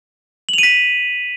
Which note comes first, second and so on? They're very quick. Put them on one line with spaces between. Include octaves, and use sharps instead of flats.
F#7 F7 D#7 B6